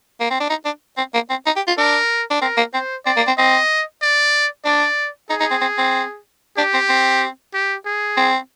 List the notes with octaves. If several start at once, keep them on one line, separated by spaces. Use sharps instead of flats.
A#3
C4
D4
D#4
D4
C4
A#3
C4
D#4
G4
F4
D4 A#4
D4
C4 A#4
A#3
C4 C5
C4 D5
A#3
C4
C4 D#5
D5
D4 D5
D#4 G#4
D#4
C4
C4
C4
D4 G4
C4
C4
G4
G#4
C4